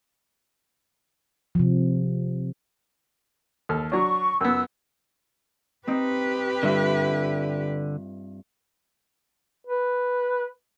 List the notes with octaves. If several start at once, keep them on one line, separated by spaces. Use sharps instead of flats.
C3 F3
D#2 A4 F6
F#3 D4 C#6
F#2 B3 E6
C4 D#4 G4 B4
G2 D3 F4 E5
B4